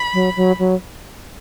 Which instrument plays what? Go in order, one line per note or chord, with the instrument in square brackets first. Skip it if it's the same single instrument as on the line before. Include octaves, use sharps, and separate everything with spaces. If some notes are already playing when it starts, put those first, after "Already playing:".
Already playing: [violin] B5
[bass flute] F#3
F#3
F#3